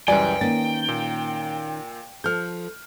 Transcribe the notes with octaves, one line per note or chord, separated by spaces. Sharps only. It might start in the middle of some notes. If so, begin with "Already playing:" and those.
C#2 F#2 E3 G3 D5 G5 G#5
D#3 A#3 C#4 A6
A#2
F3 A4 F6 G6